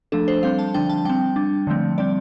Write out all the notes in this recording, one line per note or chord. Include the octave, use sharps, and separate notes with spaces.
F3 A3 D4 A4
C5
G3 C4 F5
A5
D3 F3 D4 G5
A5
G3 C4 G5
G3 D4
D3 F3 A3 C4
G3 C4 D5